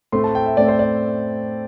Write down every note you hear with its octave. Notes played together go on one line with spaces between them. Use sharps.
A2 A3 C4 C6
A5
G5
E5
A2 A3 C4 D5
C5
D5